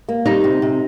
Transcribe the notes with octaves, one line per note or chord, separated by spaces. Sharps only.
A#3
G3 D#4
C3
C3